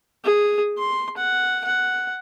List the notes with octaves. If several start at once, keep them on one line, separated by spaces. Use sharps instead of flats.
G#4
C6
F#5
F#5